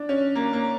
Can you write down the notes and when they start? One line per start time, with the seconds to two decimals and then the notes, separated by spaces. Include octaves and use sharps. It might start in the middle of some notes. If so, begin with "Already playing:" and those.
Already playing: D4
0.09 C#4
0.35 A#3
0.53 A#3